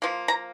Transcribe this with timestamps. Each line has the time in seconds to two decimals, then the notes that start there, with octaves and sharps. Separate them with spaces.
0.02 F3 A#3
0.28 A#5